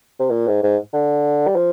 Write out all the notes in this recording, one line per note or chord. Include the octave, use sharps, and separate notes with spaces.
C3
A#2
G#2
G#2
D3
G3
F3